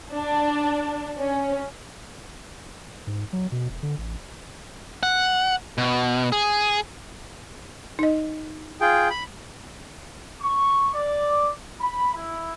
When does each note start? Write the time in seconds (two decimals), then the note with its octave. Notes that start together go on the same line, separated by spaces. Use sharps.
0.12 D4
1.18 C#4
3.07 G#2
3.33 F#3
3.52 B2
3.69 E1
3.83 D3
3.98 A1
5.03 F#5
5.78 B2
6.32 G#4
7.99 D#4 D#5
8.81 F4 G#4 G5
9.10 B5
10.41 C#6
10.94 D5
11.80 B5
12.14 E4